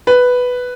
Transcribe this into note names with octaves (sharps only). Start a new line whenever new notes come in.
B4